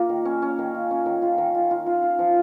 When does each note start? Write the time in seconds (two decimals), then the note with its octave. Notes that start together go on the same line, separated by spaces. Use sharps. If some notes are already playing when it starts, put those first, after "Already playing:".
Already playing: A#3 F4
0.09 D#3
0.25 C#4
0.42 C#4
0.59 D#3
0.74 F4
0.91 C#4
1.06 D#3
1.22 F4
1.38 D#3
1.54 F4
1.71 F4
1.86 F4
2.03 F4
2.19 F3